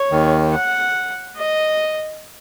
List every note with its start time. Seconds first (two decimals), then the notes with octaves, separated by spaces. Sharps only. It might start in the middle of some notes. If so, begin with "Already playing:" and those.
Already playing: C#5
0.11 D#2 D#3
0.53 F#5
1.37 D#5